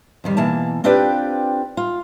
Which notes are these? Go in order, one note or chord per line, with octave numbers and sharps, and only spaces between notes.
F2 D#3 G3
B2 E3 A#3 A5
C4 D4 F4 G4 B4 D5
F4